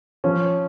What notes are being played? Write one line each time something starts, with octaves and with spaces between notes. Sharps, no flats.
F3 C#4